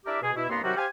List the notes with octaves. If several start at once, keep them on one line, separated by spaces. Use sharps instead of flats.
D4 E4 G4 A#4 D5 E5
B2 G#4
B2 E4
C2 G2 A#3 B3 A#5 C6
C3 D#3 F#3 G3 F#4
G4 C5 F5 G#5